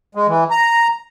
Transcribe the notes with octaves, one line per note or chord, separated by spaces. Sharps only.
G#3
E3
A#5